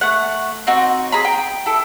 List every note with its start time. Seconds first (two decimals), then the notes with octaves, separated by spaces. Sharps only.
0.01 A3 F#5
0.67 C4 D#4 F#4 C#5
1.12 G#4 A#5 B5
1.25 G5
1.66 E4 A4